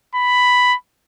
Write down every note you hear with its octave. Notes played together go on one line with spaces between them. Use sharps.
B5